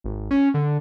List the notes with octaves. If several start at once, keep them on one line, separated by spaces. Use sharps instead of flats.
G#1
C#4
D3